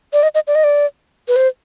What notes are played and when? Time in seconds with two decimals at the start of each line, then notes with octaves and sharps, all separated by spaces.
0.13 D5
0.23 D#5
0.35 D#5
0.47 D5
0.55 D#5
0.64 D5
1.28 B4
1.36 C5